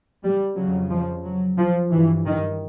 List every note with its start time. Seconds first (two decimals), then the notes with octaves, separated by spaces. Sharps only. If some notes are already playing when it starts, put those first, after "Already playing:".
0.23 G3
0.56 F2 C#3 F#3
0.90 F3
1.24 F#3
1.58 F3
1.91 G2 E3
2.26 D#3